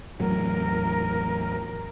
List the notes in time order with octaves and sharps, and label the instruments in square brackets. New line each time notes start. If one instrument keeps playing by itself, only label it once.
[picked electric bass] E2 A2 F#3 [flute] A#4